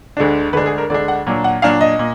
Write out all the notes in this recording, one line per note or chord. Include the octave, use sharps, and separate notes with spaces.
D2 D3 G#3 D4
D2 D3 G#3 D4 B4
G#4
A#4
D2 D3 G#3 D4 D5
F#5
A#2 F#3 D4
F#5
A#2 F#3 D4 F5
D#5
A#2